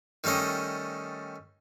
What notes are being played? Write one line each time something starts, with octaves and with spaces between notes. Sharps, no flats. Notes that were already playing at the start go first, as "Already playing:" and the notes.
D#3 G3 A3 C#4 D#5